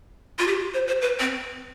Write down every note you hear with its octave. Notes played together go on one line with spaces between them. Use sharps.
F4
G4
C5
C5
B4
C4